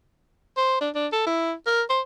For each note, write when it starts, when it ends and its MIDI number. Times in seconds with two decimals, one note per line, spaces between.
0.57 0.80 72
0.81 0.90 62
0.95 1.07 62
1.12 1.25 69
1.26 1.53 64
1.67 1.82 70
1.89 2.01 72